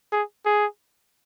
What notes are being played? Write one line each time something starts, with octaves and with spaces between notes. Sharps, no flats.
G#4
G#4